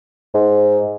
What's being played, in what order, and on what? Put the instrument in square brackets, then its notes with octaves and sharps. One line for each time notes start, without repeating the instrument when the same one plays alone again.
[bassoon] G#2